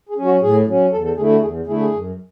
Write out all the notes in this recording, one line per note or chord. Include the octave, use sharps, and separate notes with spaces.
G#4
F#3 C#4
F#4
A2 G#4
F#3 C#4
E2 A4
A4
D3 A3 E4 G#4
F#4
E2 G#4
D3 A3 E4 G#4
G#4
F#2